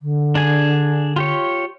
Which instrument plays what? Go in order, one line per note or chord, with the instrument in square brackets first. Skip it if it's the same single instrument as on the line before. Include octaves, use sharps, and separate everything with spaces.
[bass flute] D3
[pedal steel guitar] D4 G#4 G#5
F4 G4 C#5